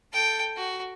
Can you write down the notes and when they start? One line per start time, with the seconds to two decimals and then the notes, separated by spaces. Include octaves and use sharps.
0.13 A4 G5
0.56 F#4